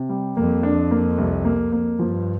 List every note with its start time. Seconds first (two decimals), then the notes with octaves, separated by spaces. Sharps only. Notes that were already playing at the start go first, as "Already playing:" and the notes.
Already playing: C3
0.09 G3
0.37 F2 A#3
0.63 D4
0.91 A#3
1.18 C2
1.45 A#3
1.72 A#3
1.99 G2 F3